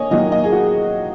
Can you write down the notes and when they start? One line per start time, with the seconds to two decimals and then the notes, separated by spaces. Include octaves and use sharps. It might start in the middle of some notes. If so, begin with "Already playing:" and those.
Already playing: A#3 C#5 D#5 G#5
0.11 D#3 F#3 A#3 D#5
0.32 D#5
0.44 G#4
0.52 F#4